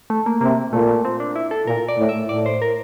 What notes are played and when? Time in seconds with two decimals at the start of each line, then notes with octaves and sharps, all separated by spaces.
0.10 A3
0.26 A#3
0.41 C3 A#3
0.73 A#2 A3
0.89 A3
1.05 C4
1.20 D4
1.36 E4
1.51 A4
1.67 A#2 A#4
1.88 D5
1.99 A2
2.09 E5
2.29 A2 D5
2.46 C5
2.62 A#4